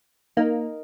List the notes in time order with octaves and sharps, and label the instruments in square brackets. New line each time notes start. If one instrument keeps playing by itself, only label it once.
[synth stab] A#3 [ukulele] D#4 A#4 D#5 A#5